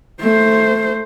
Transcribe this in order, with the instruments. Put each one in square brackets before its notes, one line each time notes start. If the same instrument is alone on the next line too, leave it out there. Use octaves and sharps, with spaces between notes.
[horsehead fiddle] A3 C5